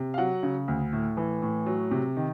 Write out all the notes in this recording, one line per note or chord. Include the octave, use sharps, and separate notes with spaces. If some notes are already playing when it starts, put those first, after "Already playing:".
Already playing: C3
F5
F#3 F#5
C#3
D2
A2
E3
A2
F#3
C3
D#3